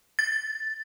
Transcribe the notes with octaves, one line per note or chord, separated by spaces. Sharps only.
A6